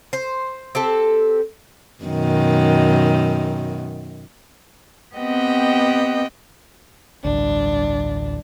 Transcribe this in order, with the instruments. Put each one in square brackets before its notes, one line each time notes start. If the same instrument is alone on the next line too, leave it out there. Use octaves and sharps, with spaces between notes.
[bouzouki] C5
C4 G4 A4
[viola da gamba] F#2 B2 D#3
[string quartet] B3 C4 G4 D#5 F#5 G5
[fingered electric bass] A1 D2 [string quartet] G2 D4